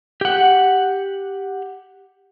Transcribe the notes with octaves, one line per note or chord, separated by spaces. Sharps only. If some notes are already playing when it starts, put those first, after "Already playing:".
G4 F#5